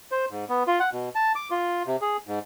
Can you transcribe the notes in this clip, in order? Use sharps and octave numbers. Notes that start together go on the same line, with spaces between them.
C5
G#2
B3
F4
F#5
B2
A5
D6
F4
C3
G#4
G#2